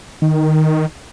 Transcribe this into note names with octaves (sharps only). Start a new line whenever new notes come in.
D#3